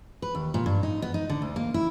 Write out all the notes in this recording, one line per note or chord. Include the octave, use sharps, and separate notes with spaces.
B4
D#2
A#2
G2
D#4
B3
D#4
D3
D2
A#3
E4